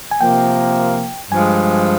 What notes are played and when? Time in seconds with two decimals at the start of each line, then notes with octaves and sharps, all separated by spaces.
0.11 G#5
0.21 C3 F3 A#3 G5
1.31 G2 F3 G#3 G#5